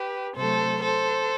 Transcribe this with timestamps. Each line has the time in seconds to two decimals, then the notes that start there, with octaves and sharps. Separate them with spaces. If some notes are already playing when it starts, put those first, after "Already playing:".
Already playing: G4 B4
0.35 C3 F#3 A3 A4 C5
0.81 A4 C5